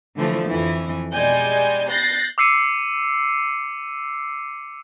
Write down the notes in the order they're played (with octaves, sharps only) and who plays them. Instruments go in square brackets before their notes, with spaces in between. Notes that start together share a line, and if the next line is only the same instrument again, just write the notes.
[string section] D3 E3 F3 A3
F2 E3
B2 G3 G#3 D5 G#5 G6
F#6 G6 A6 A#6 C7
[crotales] D6 E6 C7 C#7 D#7